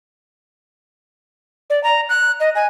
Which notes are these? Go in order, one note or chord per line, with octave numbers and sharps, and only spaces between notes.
D5
A#5
F#6
D#5
G#5